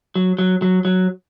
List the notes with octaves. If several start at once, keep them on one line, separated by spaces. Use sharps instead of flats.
F#3
F#3
F#3
F#3